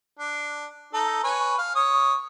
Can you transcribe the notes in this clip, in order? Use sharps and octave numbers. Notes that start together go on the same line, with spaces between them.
D4
D#4 A4
B4 C#5 G#5
F5
C#5 D#6